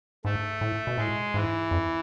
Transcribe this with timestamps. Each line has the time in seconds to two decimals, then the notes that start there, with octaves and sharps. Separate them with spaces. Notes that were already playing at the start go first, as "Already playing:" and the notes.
0.25 G#2 A3
0.61 A2
0.87 B2
0.98 A2 G#3
1.34 G#2 E3
1.71 F2